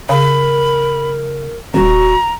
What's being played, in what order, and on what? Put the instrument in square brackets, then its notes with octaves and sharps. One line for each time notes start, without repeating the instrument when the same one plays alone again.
[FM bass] C#3 [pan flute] A#4 [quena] B5
[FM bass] D#1 [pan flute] F#4 [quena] A#5